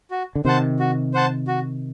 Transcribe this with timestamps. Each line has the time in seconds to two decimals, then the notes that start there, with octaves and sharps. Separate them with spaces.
0.11 F#4
0.35 D3
0.45 C3 D#3 C5 F#5 A5
0.79 F#4
1.14 C5 F#5 A5
1.47 F#4